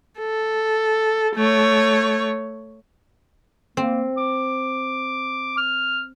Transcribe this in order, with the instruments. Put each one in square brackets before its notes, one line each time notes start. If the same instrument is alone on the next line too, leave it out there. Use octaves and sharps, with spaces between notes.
[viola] A4
A3 C#5
[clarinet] A#3 [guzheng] C4
[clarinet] D6
F6